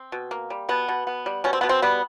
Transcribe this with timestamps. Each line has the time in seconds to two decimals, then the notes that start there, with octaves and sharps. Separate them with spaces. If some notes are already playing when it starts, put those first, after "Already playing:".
Already playing: C4
0.12 B2
0.31 A#3
0.50 G3
0.69 B2 B3
0.88 B2
1.07 B3
1.26 G3
1.44 B2 C#4
1.53 C4
1.61 B2 B3
1.69 C4
1.82 G3 B3